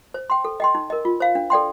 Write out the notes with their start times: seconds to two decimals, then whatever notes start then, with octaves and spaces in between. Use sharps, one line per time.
0.14 C5
0.30 G5 C6
0.45 A4
0.60 D#5 G5 C6
0.75 D#4
0.90 A#4 D#5
1.05 F4
1.20 C5 F5
1.35 D4
1.50 A4 D5 G5 C6